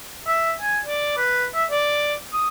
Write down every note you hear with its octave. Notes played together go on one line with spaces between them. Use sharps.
E5
G#5
D5
B4
E5
D5
D#6